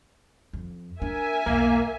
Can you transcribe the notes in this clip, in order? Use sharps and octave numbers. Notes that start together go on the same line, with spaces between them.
F2
D4 A#4 E5 G#5
B1 E2 A#3